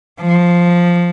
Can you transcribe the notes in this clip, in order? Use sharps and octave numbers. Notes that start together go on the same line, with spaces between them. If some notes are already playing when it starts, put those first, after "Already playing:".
F3